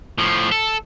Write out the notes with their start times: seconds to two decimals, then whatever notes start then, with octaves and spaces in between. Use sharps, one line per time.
0.18 A2 F3
0.52 A4